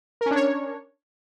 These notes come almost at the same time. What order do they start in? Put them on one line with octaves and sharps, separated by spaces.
A#4 C#4 D4 C#5